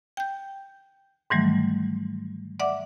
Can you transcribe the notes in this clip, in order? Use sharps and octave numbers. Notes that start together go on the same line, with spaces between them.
G5 G6
G#2 D#3 E3 F#3 G3 A3
D5 E5 F#5 D6